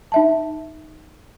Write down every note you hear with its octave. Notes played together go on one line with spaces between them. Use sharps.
D#4 E5 A5